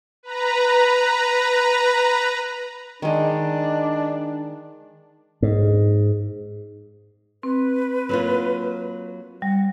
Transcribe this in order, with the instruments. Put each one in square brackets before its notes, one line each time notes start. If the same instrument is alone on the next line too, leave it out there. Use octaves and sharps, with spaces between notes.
[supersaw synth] B4 A#5
[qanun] D#3 G#3 [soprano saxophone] D4
[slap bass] G#2
[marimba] C4 [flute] B4
[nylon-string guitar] F#3 A#3 F4
[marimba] G3 [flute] F#5